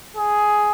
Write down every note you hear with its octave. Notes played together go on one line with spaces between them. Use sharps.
G#4